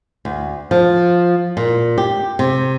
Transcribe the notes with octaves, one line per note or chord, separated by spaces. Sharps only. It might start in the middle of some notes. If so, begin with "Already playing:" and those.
D2
F3
A#2
G4
C3